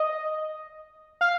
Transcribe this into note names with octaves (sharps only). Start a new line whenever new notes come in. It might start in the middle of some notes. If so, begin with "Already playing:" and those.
Already playing: D#5
F5